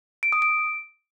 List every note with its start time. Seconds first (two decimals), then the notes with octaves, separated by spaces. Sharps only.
0.23 D7
0.32 D#6
0.42 D7